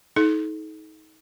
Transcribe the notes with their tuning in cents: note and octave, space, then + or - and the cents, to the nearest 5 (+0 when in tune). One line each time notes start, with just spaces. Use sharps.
D#4 +30 A4 -35